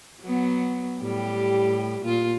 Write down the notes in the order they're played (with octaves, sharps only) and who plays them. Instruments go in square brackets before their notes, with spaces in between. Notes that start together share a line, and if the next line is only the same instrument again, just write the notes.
[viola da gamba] F#3 B3
A2 G3 G4
A#2 F4